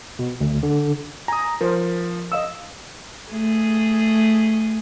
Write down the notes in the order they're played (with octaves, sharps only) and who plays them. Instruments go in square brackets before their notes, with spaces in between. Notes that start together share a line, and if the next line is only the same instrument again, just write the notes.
[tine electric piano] B2
D2
D3
[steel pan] G#5 [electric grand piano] A#5 D#6
[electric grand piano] F3 [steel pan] A#4 C5
[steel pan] D#5 F5 E6
[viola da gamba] A3 G#4